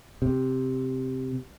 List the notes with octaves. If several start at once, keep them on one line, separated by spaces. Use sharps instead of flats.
C3